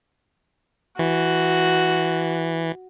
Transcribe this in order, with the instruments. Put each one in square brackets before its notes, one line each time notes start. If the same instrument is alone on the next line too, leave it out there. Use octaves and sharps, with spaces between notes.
[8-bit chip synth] E3 [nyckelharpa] F#4